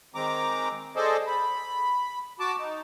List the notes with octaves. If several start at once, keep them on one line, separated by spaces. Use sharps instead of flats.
D#3 G#3 C4 A#5 D6
G#4 A4 C5 D5 D#5
B5
F#4 A5 D6
D#4